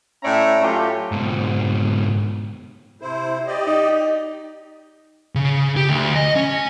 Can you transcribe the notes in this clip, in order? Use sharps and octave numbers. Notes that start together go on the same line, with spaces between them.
A2 C#4 C#5 D5 E5 A#5
F#3 A3 C#4 F4 G4
G#2 B2
C3 E4 C5
G4 D5 D#5
D#4
C#3
G4
D2
D#5
C#4